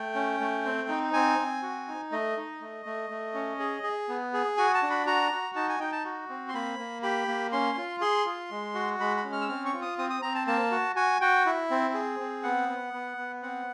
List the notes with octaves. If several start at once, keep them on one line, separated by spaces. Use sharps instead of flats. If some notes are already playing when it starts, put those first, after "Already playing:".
Already playing: A3 G5
C#4
A3
C4
D#4
C4 G#5
C4
F#4
D#4
A3 D#5
D#4
A3
A3
A3
C#4
G#4
G#4
B3
G#4
F#4 G#5
A5
D4
B5
F#4 A#5
F#4
D#4 A5
G#5
D#4 G5
A5
F#4
C4
C6
A#3 B5
A#3
G4 B5
A#3
C#4 C6
F4
G#4 C6
F4
G#3
F#4
G#3 B5
B5
C#4
F6
E6
C4 F6
C#6
F4
D#6
C4 D#6
D#6
C4 A#5
A5
A#3 A5
F#4
F#4 G#5
F#4 G5
E4
C4
G#4
C4
B3 F#5
B3
B3
B3
C4 F#5